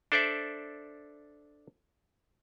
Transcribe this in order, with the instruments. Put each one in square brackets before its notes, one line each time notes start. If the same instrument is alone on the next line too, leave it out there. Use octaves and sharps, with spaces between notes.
[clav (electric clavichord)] D4 A4 C5 D5 E5